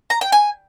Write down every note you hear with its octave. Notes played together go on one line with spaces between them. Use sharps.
A#5
G5
G#5